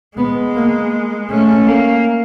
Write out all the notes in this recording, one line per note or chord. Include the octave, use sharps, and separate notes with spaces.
G#3 B3
A#3
A3 C#4
A#3